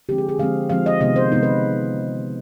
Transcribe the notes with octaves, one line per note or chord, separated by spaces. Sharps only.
D3 F3 G#3 C4 G4
G#4
G#4
D3 F3 G#3 C4 F5
D3 F3 G#3 C4 F5
D#5
C3 D#3 G#3 B3 D#5
C5
C3 D#3 G#3 B3 D#4
B4